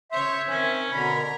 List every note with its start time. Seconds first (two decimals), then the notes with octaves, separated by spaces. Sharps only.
0.12 C#3 C#5 E5 C6 G6
0.49 D#3 C4 C#4 A#4 G#5
0.92 B2 D3 A#4 A#5 B5